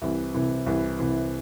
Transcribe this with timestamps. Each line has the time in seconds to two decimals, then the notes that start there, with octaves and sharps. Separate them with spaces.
0.02 C2 C3 E3
0.34 C2 C3 E3
0.66 C2 C3 E3
0.99 C2 C3 E3